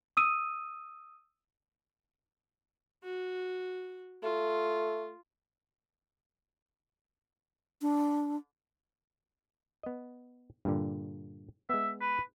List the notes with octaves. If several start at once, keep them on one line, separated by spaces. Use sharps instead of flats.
D#6 E6 D#7
F#4
A3 F4
D4
B3 D#5
G2 A#2 D3
G#3 B3 E5
B4